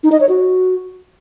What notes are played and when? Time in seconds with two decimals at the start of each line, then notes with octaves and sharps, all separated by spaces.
0.04 D#4
0.12 D#5
0.20 C#5
0.29 F#4